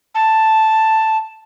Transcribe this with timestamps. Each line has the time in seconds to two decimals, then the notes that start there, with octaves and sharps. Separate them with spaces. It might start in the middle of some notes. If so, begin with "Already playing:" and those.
0.15 A5